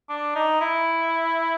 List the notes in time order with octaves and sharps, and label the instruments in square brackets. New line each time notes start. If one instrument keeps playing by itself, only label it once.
[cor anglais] D4
D#4
E4